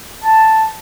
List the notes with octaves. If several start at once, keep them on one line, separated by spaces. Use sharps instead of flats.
A5